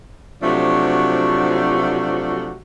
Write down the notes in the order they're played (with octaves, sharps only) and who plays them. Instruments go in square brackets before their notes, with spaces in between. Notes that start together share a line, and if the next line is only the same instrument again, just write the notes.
[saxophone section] C3 F3 F#3 A3 D4 F#4